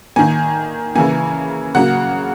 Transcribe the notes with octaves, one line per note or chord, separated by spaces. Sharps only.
D#3 A#3 G#5
C#3 E3 A#3 G#5
C#3 F#3 A#3 F#5